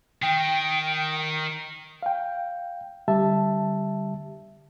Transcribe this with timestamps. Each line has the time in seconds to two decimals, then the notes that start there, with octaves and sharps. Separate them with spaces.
0.22 D#3 G5
2.03 F5 G5
3.08 D3 G3 G4 E5 A5